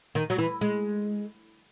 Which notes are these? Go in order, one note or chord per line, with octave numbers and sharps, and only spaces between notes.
D#3
F#3
E3
G#3